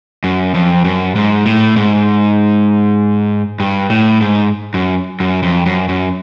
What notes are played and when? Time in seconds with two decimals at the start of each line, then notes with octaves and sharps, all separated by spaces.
0.24 F#2
0.54 F2
0.85 F#2
1.16 G#2
1.46 A2
1.76 G#2
3.60 G2
3.90 A2
4.21 G#2
4.74 F#2
5.20 F#2
5.43 F2
5.66 F#2
5.89 F#2